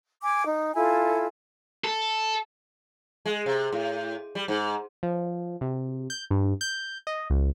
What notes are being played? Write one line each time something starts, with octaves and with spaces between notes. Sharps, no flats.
G#5 D6
D#4
E4 F4 A4 G#5
A4
G#3
C3
A2
G3
G#2
F3
C3
G6
G2
G6
D#5
C#2